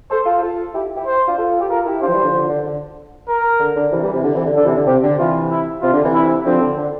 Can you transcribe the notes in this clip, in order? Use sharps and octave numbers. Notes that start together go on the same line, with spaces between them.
A4 C5
F4 A4
F4 A4
E4 G4
E4 G4
C5
D4 F4
F4 A4
G4
F4 A4 A#4
E4 G4
D4 F4 C5
F3
E3 G3
D3 F3
D3 F3
D3
D3
A#4
D3
D3
C3 E3
E3 G3
C3 E3
D3
C3 E3
D3
D3 A4
C3 E3
D3
C3 G4
D3
C3 E3 F4
E4
C3 F4
D3
C3 E3
E4
D3 F3 C4
D3
D3